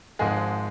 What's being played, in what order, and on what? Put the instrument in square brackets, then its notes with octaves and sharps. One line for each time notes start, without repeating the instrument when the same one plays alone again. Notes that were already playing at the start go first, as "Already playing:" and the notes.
[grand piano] G#1 G#2 F3 G#3 G#4